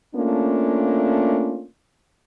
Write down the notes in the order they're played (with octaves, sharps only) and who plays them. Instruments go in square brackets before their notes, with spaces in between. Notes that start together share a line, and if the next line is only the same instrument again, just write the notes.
[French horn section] A3 A#3 C#4 D4 F4